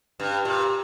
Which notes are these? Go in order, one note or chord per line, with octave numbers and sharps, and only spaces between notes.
G2
A#2